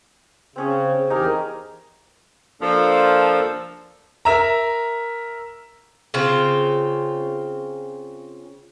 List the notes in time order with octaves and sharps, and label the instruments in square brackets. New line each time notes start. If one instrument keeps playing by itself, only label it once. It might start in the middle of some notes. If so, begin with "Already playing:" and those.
[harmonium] C#3 [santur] C4 C#4 G#4
[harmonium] E2 G4 A#4 [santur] D#4 G#4 F5
[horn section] F3 [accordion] A#3 D4 A4
[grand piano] A#4 E5 A#5
[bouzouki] C#3 C4 F4